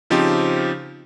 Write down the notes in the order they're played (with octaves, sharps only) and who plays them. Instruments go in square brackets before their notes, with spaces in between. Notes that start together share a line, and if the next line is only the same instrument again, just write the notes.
[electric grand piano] C#3 F3 C4 D#4 F4 G4